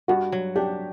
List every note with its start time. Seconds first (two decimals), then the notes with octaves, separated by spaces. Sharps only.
0.08 G2 F#4
0.32 F#3
0.55 D4 G4